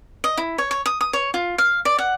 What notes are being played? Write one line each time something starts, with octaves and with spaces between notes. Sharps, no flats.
D#5
E4
C#5
C#5
D#6
D#6
C#5
F4
F5
D5
F#5